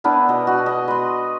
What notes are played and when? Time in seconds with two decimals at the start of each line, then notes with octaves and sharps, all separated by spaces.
0.04 B3 D4 E4 A#4
0.29 B2 D#5
0.47 F#4
0.66 D#5
0.88 B4 C6